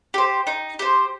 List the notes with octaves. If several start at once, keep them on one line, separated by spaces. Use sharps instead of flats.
G4 C5
D#4
G4 C5